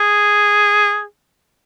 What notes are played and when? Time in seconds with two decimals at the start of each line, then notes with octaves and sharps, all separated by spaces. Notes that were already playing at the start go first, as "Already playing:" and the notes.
Already playing: G#4